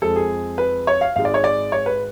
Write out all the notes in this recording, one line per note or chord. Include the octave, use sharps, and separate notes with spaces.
F2 F3 G#3 A4
G#4
B4
C#5
F5
G#1 G#2 G#3 F5
D5
C#5
D5
C#5
B4